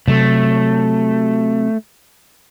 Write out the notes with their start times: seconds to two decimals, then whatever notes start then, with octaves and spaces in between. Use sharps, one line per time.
0.08 C3 F#3 A3